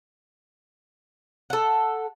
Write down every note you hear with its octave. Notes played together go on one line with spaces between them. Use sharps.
A4 F#5